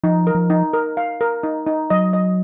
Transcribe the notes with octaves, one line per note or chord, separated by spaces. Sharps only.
F3 D#4
A#4
F3
D#4
A#4
F5
A#4
D#4
D#4
F#3 D#5
D#5